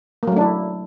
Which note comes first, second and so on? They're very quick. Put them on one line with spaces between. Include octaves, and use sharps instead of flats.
A#3 F#3 A3 D4 E4